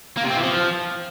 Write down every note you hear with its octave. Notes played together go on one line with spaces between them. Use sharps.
A#3
C3
C4
E3
F3